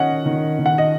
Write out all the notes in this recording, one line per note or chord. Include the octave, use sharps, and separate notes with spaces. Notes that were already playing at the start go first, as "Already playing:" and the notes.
Already playing: D#3 C#4 D#5 F#5
D#3
D#3
F#5
D#5